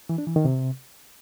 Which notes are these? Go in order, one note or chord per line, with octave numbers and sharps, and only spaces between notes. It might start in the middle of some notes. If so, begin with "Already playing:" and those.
E3
D4
E3
D#3
C3